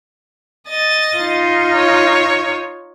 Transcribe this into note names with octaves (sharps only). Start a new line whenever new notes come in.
D#5 A6
D#4 F4
C#5